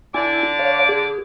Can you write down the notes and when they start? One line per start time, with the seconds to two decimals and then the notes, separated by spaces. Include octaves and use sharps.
0.14 D3 E4 D5 G#5
0.59 C#5 F5
0.89 G#4